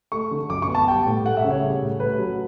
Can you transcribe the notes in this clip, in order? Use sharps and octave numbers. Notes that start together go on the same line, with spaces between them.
A3 C#6
D3
F#2 D6
C#6
B3
A5
G3 G5
A2
A3 F#5
E5
C#3
C#5
G3
A2
A3 B4
F#3